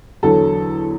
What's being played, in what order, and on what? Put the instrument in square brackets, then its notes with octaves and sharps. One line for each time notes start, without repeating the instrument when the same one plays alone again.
[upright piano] E2 D3 F#3 A4